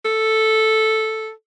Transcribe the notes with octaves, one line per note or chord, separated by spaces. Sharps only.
A4